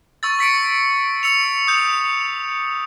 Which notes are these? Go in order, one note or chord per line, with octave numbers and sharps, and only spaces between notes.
C#6 E6 A6
C#6 B6 C#7 D7
E6 C#7 F7
D#6 G6